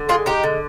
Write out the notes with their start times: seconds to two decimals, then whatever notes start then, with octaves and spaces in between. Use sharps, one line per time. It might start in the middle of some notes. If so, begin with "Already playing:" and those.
Already playing: D3
0.09 G#3 F4 G#4
0.26 G#3 D#4 G4
0.43 D3